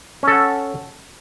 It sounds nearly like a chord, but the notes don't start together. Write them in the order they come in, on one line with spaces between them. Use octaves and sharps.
C#4 A4 F#5